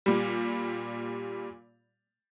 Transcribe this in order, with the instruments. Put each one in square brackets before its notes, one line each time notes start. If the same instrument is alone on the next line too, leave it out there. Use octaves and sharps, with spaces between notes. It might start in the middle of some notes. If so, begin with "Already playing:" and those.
[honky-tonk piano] A#2 G3